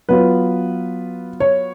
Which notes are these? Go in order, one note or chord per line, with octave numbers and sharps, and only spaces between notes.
F#3 B3 F4 B4
C#5